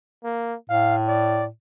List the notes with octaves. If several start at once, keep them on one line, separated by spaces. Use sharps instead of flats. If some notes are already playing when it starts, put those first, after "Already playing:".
A#3
A2 F5
D5